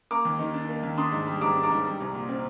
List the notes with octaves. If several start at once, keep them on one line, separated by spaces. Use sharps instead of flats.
A#3 A#5 D6
D#2
D#3
D4
A#3
D#2
D4 C6 D#6
G#2
G3
G#2 A#5 D6
D4
A#5 D6
G#2
G3
C2
A#2
C4